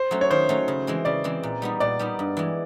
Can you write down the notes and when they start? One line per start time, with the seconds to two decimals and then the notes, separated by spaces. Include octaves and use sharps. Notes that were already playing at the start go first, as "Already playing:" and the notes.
Already playing: C5
0.11 F#3 A3 C#4
0.21 C#5
0.30 D#3 C5
0.49 F#3 A3 C#4
0.68 C#3
0.87 E3 G#3 C4
1.05 C#3 D5
1.24 E3 G#3 C4
1.43 A#2
1.62 G3 B3 D#4
1.80 A#2 D5
1.99 G3 B3 D#4
2.19 G2
2.37 E3 G#3